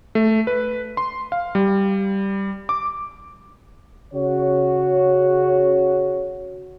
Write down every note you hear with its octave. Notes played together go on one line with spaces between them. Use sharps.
A3
B4
C6
F5
G3
D6
C#3 F#4 C#5